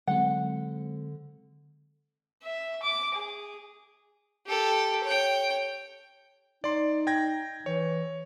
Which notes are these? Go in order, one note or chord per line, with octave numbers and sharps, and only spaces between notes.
D3 F#3 G#3 C4 F#5
E5
D6
G#4
G4 A4
C#5 G5
D#4 D5 C6
G5 G#6 A#6
E3 C#5